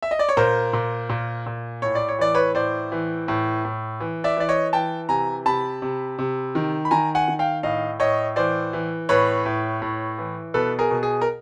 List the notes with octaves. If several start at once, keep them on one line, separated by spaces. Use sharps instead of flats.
E5
D#5
D5
C#5
A#2 A#4 C5
A#2
A#2
A#2
A2 C#5
D5
C#5
E3 D5
B4 C#5
A2 C5 D5
E3
A2
A2
E3
D5 E5
E3 D5
C#5 D#5
E3 G5 A5
C3 G#5 A#5
C3 A5 B5
C3
C3
D#3
B5
D#3 G#5 A#5
F#5 G#5
D#3
F5 G5
A2 D#5 F5
A2 C#5 D#5
E3 C5 D5
E3
A2 B4 C#5
A2
A2
E3
B2 A4 B4
G#4 A#4
B2
G#4
A#4